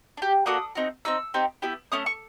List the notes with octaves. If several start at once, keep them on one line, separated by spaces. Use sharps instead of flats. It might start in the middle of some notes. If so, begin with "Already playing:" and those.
D4
G4
A#3 D4 F#4 A4 D#6
C4 D#4 F#4
C4 D#4 E6
C4 D#4 G4
B3 E4 G4
A3 C#4 D#6
C#6